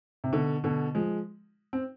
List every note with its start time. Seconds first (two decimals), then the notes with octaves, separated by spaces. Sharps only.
0.24 C3
0.33 B2 D3
0.64 B2 D3
0.95 F3 G#3
1.73 C4